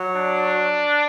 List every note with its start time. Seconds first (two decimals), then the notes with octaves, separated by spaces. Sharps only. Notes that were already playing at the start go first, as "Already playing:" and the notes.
Already playing: F#3
0.15 D4